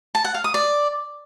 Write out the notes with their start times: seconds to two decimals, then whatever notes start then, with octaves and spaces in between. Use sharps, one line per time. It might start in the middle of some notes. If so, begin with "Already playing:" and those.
0.15 A5
0.25 F#5
0.34 F5
0.44 D#6
0.54 D5